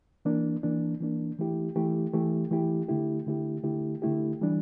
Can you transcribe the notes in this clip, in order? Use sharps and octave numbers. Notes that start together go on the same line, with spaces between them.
E3 A#3 D4
E3 A#3 D4
E3 A#3 D4
E3 A3 E4 G4
E3 A3 E4 G4
E3 A3 E4 G4
E3 A3 E4 G4
D3 A3 E4 G4
D3 A3 E4 G4
D3 A3 E4 G4
D3 A3 E4 G4
E3 G3 D4